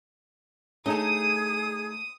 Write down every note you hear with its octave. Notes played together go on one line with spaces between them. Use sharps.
A3 D#4 G#4 C#5 A5 D#6